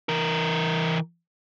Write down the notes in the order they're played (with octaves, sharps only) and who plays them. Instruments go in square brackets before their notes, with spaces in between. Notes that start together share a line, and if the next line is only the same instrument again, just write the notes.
[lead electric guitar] E3 A#4